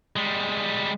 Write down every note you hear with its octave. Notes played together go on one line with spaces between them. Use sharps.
G3 G#3